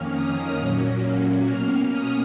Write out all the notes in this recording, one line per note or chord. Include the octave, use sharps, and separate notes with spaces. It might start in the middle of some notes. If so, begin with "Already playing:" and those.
Already playing: F2 D#3 A#3 C#4 F6
D#6
A#2 F#3 A#3 C#4
B2 A#3 C#4 F6
D#6